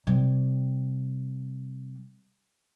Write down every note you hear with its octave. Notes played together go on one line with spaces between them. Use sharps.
C3 G3